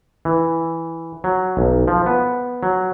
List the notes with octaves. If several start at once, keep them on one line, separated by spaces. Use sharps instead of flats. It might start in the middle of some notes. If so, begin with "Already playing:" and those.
E3
F#3
B1
F3
B3
F#3